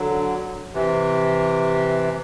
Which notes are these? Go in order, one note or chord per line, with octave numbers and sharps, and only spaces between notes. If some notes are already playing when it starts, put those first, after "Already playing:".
Already playing: D3 F#3
C3 E3